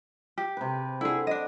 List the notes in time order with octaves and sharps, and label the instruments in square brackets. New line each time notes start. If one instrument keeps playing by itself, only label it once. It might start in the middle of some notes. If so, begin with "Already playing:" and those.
[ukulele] G4
[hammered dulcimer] C3 B4
[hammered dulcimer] D3 [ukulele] E4 G#4
[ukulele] D4 D#5